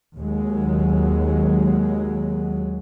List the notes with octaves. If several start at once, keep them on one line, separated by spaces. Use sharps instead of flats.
D#2 F#3 G#3